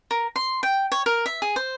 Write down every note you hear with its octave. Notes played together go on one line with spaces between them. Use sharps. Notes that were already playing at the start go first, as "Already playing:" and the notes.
A#4
C6
G5
C#5
A#4
E5
G#4
C5